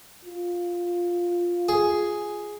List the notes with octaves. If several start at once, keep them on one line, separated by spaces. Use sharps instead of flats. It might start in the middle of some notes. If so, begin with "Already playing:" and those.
F4
G#4